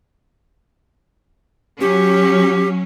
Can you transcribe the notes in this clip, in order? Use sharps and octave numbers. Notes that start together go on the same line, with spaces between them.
F#3 C#4 G4